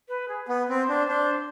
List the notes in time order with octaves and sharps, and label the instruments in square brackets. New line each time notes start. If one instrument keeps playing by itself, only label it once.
[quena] B4
G#4
G#4
[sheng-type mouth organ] B3 [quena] B4
[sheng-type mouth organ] C4
[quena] C5
[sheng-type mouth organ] D4
[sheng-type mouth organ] D4 [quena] C5